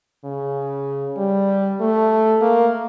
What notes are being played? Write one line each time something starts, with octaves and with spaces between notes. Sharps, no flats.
C#3
G3
A3
A#3